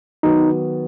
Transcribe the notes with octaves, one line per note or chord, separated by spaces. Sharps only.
D#3 F#3 B3 D#4 F#4